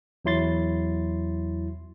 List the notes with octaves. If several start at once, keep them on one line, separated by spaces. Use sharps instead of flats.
E2 F#3 E4 C6 A6